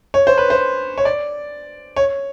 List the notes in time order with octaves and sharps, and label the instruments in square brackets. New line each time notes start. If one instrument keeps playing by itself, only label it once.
[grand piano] C#5
C5
B4
C5
C#5
D5
C#5